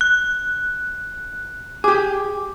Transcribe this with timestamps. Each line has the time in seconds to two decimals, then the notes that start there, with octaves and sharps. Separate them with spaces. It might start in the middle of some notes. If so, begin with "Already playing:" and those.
0.01 F#6
1.84 G4 G#4 D6